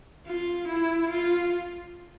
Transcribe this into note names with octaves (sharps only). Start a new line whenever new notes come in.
F4
E4
F4